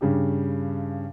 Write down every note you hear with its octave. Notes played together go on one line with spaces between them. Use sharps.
G2 C#3 G4